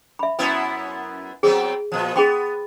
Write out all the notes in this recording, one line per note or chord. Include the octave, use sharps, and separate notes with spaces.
E5 B5
F#2 B3 E4
F#3 B3 C4 G#4
A#2 F3
B3 G#4 G5 C6